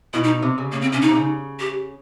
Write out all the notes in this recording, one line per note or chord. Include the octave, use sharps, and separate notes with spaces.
B2 E4
D#4
C3
C#3
C#3 A#3
C4
C3 C#4
C#3 D#4
C3
C#3
G4